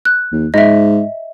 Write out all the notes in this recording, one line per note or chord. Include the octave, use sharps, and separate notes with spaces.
F#6
D#2
G#2 D#5 E5